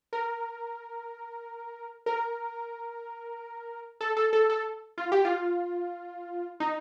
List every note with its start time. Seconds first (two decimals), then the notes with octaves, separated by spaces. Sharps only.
0.13 A#4
2.06 A#4
4.01 A4
4.17 A4
4.33 A4
4.50 A4
4.98 F4
5.12 G4
5.25 F4
6.60 D#4